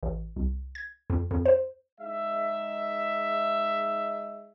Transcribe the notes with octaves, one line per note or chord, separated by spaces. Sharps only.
A1
C2
G#6
F2
F2
C5
G#3 D#4 E5